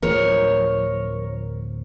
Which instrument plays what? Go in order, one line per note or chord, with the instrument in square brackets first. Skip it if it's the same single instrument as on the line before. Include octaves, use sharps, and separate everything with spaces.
[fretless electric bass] D1 F3 [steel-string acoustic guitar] A#4 C#5